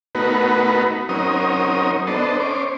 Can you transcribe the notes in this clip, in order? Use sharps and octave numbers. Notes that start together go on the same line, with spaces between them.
A3 B3 D#4 F#4 A#4 B4
F#3 C4 C#4 D#4 A#4 D#6
B3 D4 A4 C5 D#5
C#4 C5 D6